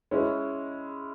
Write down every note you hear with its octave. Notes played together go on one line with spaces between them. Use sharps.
G#3 C#4 E4